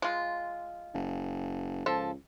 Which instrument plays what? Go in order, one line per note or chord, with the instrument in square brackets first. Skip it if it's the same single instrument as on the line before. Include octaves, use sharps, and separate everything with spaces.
[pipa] G#3 F4
[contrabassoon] F#1
[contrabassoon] C#2 [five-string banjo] F3 A4